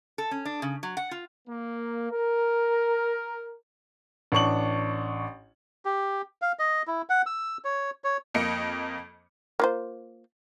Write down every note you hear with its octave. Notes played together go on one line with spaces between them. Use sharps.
A4
C#4
D4
C#3
F#3
F#5
F4
A#3
A#4
A1 D4 C#6 F#7
G4
F5
D#5
E4
F#5
E6
C#5
C#5
F2 A#3 D#5 C#7
A#3 F4 C5